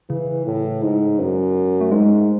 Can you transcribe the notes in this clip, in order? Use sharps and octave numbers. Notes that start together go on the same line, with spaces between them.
C#3 E3
A2
G#2
F#2
A3
G#2 G#3